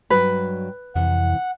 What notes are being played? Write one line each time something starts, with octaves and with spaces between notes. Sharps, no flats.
G2 F#3 B4 G5
F2 C3 E3 F#5